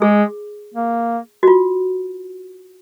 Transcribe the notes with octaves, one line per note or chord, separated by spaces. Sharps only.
G#3 G#4
A#3
F#4
F4